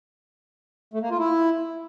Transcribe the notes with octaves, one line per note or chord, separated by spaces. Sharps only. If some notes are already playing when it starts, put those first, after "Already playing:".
A3
A#3
F4
E4